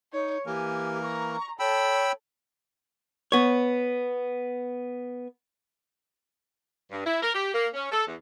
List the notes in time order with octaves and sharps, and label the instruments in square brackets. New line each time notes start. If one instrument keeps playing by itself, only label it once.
[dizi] D#4 [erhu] C#5
[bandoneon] E3 A#3 A#4 [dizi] G4 [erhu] G#5
[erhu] A#5 [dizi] C#6
[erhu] A4 [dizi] C#5 [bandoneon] G5 B5 E6
[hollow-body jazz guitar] B3 C#5
[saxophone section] G2
E4
A#4
G4
A#3
C#4
A4
E2